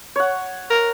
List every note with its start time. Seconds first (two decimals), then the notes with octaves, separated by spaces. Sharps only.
0.16 C#5 F#5
0.70 A#4